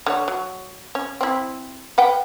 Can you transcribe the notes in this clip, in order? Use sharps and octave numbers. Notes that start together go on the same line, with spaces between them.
D3 G4 C#5
F#3
C#4
C4 E4
B4 F#5 G5